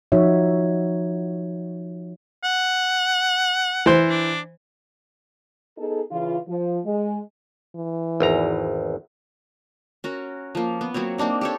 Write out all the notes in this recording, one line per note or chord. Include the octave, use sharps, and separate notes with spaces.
F3 D#4 F#4 C#5 E5
F#5
E3 C5
D4
B3 D#4 G#4 A4
C#3 E3 F4
F3
G#3
E3
G#1 E2 A#5
C#4 F#4 A#4
F3 A#3
B3
F#3 A#3 C4 C#5
A#3 C4 D4 D#4
G4 A4 C#5